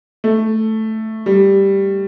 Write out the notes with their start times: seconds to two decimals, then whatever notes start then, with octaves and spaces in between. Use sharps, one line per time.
0.24 A3
1.26 G3